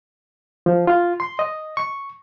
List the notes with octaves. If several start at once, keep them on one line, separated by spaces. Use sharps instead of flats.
F3
F4
C6
D#5
C#6